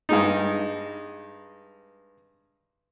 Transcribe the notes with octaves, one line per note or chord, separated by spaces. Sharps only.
G2 G#3 D#4